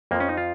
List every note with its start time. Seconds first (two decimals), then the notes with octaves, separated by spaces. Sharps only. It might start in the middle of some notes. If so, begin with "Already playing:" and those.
0.11 F2 A#3
0.15 F3
0.20 C#4
0.29 D#4
0.37 F4